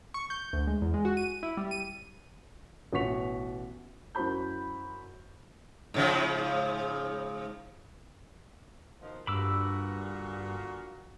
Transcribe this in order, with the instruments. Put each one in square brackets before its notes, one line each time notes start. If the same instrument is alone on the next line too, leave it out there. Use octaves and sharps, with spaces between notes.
[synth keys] C#6
G6
D2
G#3
E2
G#3
F#4
D#7
E4
G3
D#7
[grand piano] A1 B2 F#4 C#6 B6 F7
[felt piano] F#2 E4 F#4 C5 B5 G6
[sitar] G#2 C#3 F3
[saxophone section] B2 D#3 F3
[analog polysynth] G2 [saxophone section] A#2 D3 F#4 [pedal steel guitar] B5 D6 E6